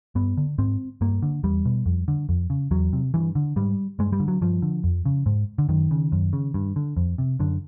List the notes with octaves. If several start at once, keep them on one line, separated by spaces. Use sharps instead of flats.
G2 B3
D3
G#2 C4
G2 A#3
D3
E2 G3
B2
F2
D3
F2
C#3
E2 F#3
C3
G2 E3
D3
G#2 G3
G2 G#3
G3
D3
F#3
G2 F3
D3
F2
C#3
G#2
D3
F#2 D#3
C#3
F#2
C#3
G2
D3
F2
C3
F#2 D3